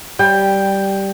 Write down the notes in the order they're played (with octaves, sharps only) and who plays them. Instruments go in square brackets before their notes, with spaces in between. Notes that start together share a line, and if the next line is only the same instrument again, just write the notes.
[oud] G3 [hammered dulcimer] G5